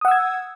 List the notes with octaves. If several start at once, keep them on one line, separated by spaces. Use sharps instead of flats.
F#5 D#6 E6 G#6